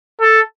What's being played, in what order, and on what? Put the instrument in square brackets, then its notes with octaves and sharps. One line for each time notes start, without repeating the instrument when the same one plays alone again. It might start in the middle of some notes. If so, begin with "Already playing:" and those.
[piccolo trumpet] A4